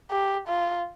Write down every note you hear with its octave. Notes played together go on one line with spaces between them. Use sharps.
G4
F4